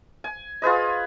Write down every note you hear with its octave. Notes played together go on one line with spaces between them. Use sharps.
G#5
F4 G#4 B4 D#5